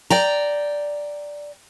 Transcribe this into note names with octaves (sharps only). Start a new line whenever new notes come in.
D5 G5 A#5